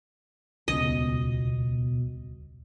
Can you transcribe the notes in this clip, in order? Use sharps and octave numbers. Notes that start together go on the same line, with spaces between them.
D#1 C#2 B2 C#4 D#5